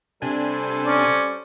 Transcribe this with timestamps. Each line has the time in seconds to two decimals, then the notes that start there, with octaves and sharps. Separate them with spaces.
0.22 C3 G3 D4 A4 C5 G#5
0.86 C#4 D5